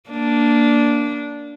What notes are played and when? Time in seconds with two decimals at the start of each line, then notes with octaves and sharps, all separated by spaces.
0.10 A#3 D4